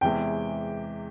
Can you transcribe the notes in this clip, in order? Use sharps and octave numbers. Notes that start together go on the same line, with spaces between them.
E2 C3 E3 G#3 G5